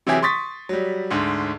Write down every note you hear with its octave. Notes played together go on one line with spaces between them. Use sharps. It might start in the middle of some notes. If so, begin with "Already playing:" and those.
C3 E3 F#3 E4 G4 G#4
C6 C#6 D#6 A6 B6
F#3 G3
D2 G#2